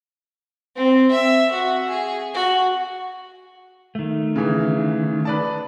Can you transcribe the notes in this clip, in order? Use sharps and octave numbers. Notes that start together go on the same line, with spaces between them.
C4
E5
F#4
G#4
F#4
D#3 A3
C#3 E3
B4 D5 A5